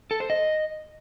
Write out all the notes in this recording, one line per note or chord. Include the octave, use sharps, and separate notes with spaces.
A4
C5
D#5